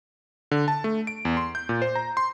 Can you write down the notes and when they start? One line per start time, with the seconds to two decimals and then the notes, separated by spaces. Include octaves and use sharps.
0.51 D3
0.68 A5
0.84 A3
1.07 D7
1.25 E2
1.37 C6
1.55 G6
1.69 A#2
1.82 C5
1.95 A#5
2.17 C6